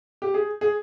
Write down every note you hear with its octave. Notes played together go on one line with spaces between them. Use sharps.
G4
G#4
G#4